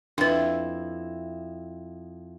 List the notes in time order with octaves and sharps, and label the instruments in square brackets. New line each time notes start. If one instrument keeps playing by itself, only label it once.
[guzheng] F2 E4 [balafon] D4 B4